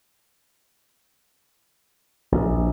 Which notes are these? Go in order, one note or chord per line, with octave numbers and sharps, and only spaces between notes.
A#1